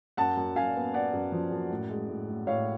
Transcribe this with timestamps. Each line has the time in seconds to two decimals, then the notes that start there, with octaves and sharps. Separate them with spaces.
0.17 F#2 F#5 A5
0.37 F#2
0.56 F#2 F5 G#5
0.75 B3
0.94 B3 D5 F#5
1.13 F#2
1.32 F3
1.52 F#2
1.70 A2
1.90 G#3
2.08 A2
2.28 A2
2.47 A2 C#5 F5